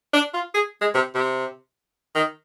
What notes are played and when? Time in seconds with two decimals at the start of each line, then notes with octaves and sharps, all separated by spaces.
0.14 D4
0.34 F4
0.55 G#4
0.81 G#3
0.95 C3
1.15 C3
2.15 D#3